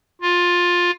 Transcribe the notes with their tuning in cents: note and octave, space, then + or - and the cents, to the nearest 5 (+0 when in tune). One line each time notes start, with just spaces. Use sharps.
F4 +15